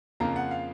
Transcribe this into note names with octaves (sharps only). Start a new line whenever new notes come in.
F2 C#3 F3 A#3 F4 A#5
F#5
F5